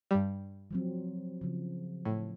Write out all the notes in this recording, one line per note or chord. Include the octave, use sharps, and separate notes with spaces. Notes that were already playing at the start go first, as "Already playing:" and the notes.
G2 G3
F3 F#3 C4
C#3 F3
A2